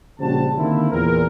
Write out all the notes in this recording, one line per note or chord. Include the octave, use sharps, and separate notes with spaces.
A#1 C#3 G3 F#4 C5 A5
D3 D#3 A#3 C4 E4
E2 A#2 A#4